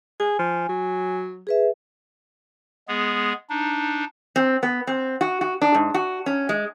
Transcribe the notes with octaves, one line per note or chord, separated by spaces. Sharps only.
G#4 G#5
F3
F#3
G#4 B4 E5
G#3 B3 G#4
D4 D#4
C4
B3
C4
F#4
F#4
D4
G#2
F#4
C#4
G#3